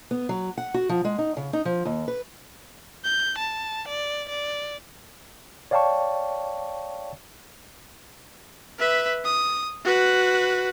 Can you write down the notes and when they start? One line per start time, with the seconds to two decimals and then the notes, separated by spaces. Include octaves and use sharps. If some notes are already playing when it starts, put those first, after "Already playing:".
0.11 B3
0.29 F#3
0.58 F#5
0.74 F#4
0.89 F3
1.05 G#3
1.18 D#4
1.37 C#3
1.53 D#4
1.65 F3
1.85 D#2
2.08 B4
3.04 G6
3.39 A5
3.89 D5
4.30 D5
5.71 C#5 D5 F5 G5 A5 C#6
8.79 B4 E5
9.25 D#6
9.85 F#4 B4